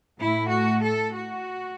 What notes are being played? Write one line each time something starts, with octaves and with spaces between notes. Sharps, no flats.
A2 A3 E4
F#4
A4
F#4